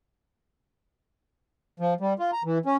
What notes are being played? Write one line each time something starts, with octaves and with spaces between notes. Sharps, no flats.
F3
G3
F4
A#5
E3
C#4